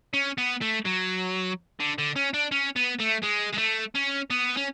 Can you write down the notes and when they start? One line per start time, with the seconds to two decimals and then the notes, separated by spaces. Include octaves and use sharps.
0.14 C#4
0.38 B3
0.61 A3
0.86 F#3
1.80 D3
1.98 D3
2.16 C#4
2.34 D4
2.52 C#4
2.76 B3
3.00 A3
3.23 G#3
3.54 G#3
3.59 A3
3.95 C#4
4.31 B3
4.57 C#4